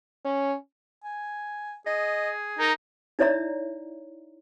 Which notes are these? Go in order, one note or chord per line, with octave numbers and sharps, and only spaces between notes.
C#4
G#5
G#4 D#5
D#4 A#4
D#4 E4 C#5 D5 E5 A#5